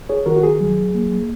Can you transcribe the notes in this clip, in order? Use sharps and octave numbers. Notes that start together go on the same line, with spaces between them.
G#4 C#5
D#3 F#4 A#4
F#4
G#4
F#3
A#3